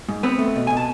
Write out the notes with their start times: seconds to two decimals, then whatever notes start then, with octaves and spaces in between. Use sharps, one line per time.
0.09 G#2
0.23 B3 C4 B4
0.39 A3
0.55 B2
0.67 B2 G#5
0.77 A5